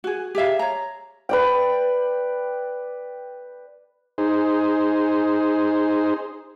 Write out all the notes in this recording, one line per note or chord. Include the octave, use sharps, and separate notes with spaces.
F#4 G#4
G4 G#4 E5 F5
C#5 A#5
B4 D5 G5
D#4 G#4 C5